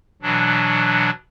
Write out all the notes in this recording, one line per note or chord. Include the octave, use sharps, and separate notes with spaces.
B2 E3 F#3 D4